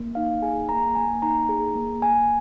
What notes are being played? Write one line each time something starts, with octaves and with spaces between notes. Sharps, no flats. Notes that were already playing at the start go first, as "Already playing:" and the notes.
Already playing: A#3
D#4 F5
G#4 G#5
A#3 A#5
A#3 G#5
D#4 A#5
G#4
A#3
A#3 G#5